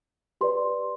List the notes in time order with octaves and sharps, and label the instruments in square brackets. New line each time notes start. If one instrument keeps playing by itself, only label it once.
[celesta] G4 B4 D5 C6